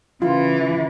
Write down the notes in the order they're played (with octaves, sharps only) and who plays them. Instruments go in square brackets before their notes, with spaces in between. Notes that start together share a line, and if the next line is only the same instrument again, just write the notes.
[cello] C#3 E3 [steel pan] F4